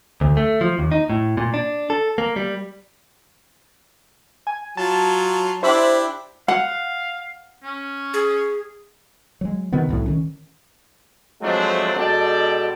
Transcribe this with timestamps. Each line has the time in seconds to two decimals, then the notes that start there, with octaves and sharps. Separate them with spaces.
0.21 D2
0.37 A3
0.61 F3
0.79 D#2
0.92 D#4
1.10 A2
1.37 A#2
1.54 D4
1.90 A4
2.18 A#3
2.36 G3
4.47 G#5
4.77 F#3 F4 A5
5.63 D4 E4 G4 C5 E5 B5
6.48 F5 F#5
7.64 C#4
8.14 G#4
9.41 F#3 G#3
9.73 C3 D#3 B3
9.89 C2 A2 F#3
10.06 D#3 C#4
11.42 F3 F#3 G#3 A3 C4 D4
11.96 B2 G#3 A4 D5 G5 A5